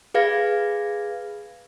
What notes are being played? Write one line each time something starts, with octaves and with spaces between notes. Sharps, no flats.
G#4 B4 F5 G#6 A#6